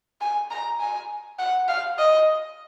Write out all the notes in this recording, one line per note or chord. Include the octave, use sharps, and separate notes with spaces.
G#5
A#5
G#5
F#5
F5
D#5